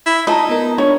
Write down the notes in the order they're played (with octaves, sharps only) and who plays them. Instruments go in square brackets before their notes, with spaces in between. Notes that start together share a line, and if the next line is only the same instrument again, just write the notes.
[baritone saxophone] E4
[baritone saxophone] D#4 [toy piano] F4 A5 A#5 [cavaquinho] D#5
[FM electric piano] B3 A#4
[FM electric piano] D4 [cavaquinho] C#5